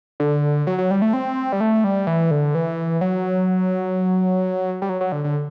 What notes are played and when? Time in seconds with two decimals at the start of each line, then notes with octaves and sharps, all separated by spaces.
0.20 D3
0.67 F#3
0.78 F#3
0.91 G3
1.02 A3
1.13 C4
1.52 G3
1.60 A3
1.84 G3
2.07 E3
2.31 D3
2.55 E3
3.01 F#3
4.82 G3
4.89 F#3
5.01 F#3
5.12 D3
5.24 D3